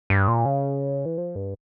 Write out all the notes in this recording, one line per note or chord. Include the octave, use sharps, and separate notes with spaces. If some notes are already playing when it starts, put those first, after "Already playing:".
G2
A#2
C#3
E3
F3
G2